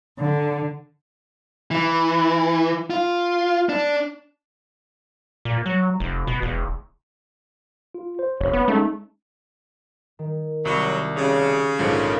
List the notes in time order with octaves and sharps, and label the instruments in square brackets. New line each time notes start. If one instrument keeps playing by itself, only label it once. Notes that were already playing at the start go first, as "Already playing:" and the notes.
[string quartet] D3
[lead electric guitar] E3
F4
D4
[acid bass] A#2
F#3
F1
B2
E1
[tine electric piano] F4
C5
[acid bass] F1 [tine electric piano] C#5
[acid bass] B3
[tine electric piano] G#3 C#4 D#4 [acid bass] A3
[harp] D#3
[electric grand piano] C2 [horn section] F#3 [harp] B5 C#6
[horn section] C#3 [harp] C#4 G4
[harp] A#1 A3 D#7 [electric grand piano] G#2 D3 F3